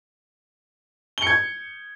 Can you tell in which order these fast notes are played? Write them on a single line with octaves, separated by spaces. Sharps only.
G7 C#7 G#6